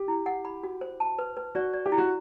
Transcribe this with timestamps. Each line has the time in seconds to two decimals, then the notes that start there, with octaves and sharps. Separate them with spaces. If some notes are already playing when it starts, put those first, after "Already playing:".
Already playing: G4
0.08 E4
0.26 F#5
0.45 B5
0.63 F#4
0.81 C5
1.00 A5
1.19 B4
1.37 B4
1.55 F#4 D5
1.73 D5
1.86 G4
1.92 E4
1.98 F#4